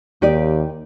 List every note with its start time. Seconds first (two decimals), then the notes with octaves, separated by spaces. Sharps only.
0.22 D#2 D#4 G4 D5